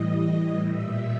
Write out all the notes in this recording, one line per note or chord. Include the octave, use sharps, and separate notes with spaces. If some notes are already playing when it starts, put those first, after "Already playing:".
Already playing: A2 E3 G3 D#5
A#2 G3 E5